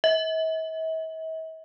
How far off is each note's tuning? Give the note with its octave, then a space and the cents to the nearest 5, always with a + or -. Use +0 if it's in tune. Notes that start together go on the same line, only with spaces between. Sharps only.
E5 -45